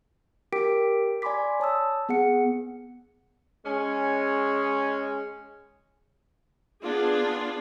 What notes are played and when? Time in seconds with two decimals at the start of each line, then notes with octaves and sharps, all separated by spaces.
0.53 G4 A#4 G5 D6 B6 D7
1.22 D5 G#5 B5 C6 D6 B6
1.60 C#5 A5 D#6 E6
2.09 B3 G#4 F#5 C#7
3.65 G#3 C#4
6.82 B3 D4 F4 G#4